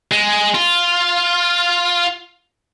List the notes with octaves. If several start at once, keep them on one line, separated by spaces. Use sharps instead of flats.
G#3
F4